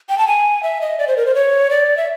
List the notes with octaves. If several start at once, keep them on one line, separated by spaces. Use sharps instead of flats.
G5
A5
G#5
E5
D#5
D5
C5
A#4
C5
C#5
D5
E5